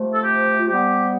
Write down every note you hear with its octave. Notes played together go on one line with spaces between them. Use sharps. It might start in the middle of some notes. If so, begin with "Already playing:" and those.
Already playing: C3 F3 A3
A4
G4
F4
C3 G3 B3 G4